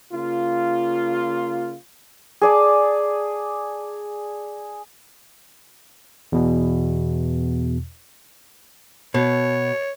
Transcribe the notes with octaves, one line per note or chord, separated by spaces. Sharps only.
C#3 A#3 F4
G#4 D5 A5
E2 B2
B2 C#5